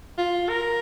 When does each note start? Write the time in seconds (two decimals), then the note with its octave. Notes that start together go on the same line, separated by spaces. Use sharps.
0.18 F4
0.49 A#4